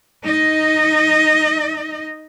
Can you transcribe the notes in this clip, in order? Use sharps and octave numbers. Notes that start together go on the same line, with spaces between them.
D#4 D#5